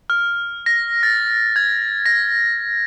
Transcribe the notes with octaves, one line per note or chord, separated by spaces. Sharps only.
F6
A#6
A6
G#6
A#6